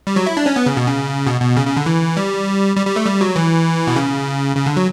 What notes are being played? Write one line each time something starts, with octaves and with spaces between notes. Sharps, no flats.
G3
F#3
E4
D4
C#4
B3
C#3
B2
C#3
B2
B2
C#3
C#3
D3
E3
G3
G3
G3
A3
G3
F#3
E3
B2
C#3
C#3
D3
F#3